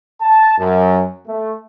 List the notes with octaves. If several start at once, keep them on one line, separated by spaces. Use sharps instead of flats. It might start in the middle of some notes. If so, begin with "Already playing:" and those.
A5
F#2
A3